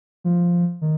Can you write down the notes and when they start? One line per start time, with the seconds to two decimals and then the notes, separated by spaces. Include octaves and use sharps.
0.24 F3
0.81 D#3